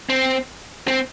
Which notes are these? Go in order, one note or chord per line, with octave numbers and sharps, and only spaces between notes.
C4
C4